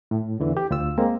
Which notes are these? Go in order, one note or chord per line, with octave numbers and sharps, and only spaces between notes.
A2
E2 D3 E3
G4
D2 F4 E6
G#3 A#3 C4